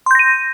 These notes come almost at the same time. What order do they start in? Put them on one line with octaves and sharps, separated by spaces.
C6 G6 A#6 D#7